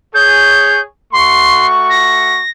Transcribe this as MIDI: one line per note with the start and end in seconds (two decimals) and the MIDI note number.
0.15 0.81 68
0.15 0.81 73
0.15 0.81 91
1.13 2.42 57
1.13 2.42 66
1.13 1.67 84
1.13 2.42 85
1.90 2.50 94